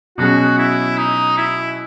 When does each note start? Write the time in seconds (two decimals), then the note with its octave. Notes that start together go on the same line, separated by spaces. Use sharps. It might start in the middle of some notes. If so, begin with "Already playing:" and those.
0.18 B2 F#3 C#4 F#4 G#4
0.58 E4
0.97 D#4
1.37 E4